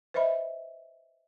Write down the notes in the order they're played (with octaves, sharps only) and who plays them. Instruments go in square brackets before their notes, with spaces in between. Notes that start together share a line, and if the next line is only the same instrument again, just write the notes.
[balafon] B4 C5 D#5 E5 B5